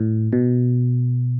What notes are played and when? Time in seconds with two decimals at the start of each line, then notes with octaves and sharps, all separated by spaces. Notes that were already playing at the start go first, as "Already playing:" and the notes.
Already playing: A2
0.33 B2